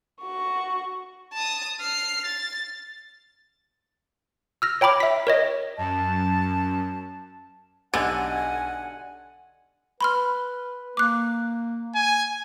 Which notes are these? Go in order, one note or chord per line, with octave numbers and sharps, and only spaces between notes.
F#4 C#6
A5 D#6
F6 C7
A6
E6 F6 A#6
C#5 G5 A#5 B5 D6
E5 B6
A#4 C#5 D#5
F#2 A5
B1 D3 G4 F#5 G#5
B4 B5 C6 F6
A#3 D6 F#6
G#5